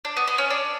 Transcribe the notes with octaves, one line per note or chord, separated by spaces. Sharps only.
D4
B3
B3
C#4
D4